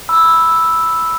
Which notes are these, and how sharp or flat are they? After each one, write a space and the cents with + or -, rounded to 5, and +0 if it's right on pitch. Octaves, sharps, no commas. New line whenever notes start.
B5 +0 E6 +0